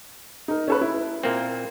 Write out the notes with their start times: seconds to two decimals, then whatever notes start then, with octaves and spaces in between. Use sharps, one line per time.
0.48 D#4 A#4
0.68 C#4 A4 B4
0.81 E4
1.23 A#2 A#3 C4